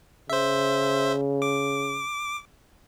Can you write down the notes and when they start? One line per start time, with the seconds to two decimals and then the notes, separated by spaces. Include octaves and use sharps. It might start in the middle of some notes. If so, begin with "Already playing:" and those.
0.29 C#3 C5 E5
1.42 D6